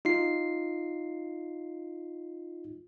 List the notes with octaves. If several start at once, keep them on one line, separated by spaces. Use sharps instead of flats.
D#4 F4 C7